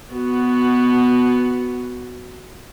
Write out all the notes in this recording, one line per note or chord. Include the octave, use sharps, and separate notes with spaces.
B3 F#4